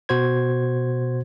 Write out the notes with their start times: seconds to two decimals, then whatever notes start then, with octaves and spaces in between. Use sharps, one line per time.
0.09 B2 F#4 C5 G#6